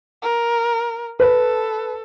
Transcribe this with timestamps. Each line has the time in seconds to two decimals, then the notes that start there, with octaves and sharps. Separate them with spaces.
0.23 A#4
1.20 A4 B4